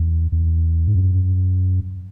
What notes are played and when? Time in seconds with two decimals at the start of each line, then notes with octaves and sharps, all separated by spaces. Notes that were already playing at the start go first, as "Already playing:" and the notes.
Already playing: E2
0.32 E2
0.88 G#2
0.95 F#2